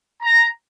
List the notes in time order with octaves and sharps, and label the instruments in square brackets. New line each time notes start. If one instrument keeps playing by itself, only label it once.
[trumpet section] A#5